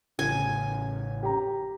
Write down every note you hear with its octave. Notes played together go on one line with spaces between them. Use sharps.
A1 C#3 G#5
G4 A#5